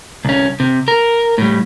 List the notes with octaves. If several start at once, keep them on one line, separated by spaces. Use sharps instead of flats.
C2 C#4
C3
A#4
A2 G3